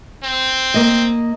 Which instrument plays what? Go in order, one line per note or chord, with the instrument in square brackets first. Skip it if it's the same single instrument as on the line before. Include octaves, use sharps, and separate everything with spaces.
[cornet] C4
[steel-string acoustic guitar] A#3 D#5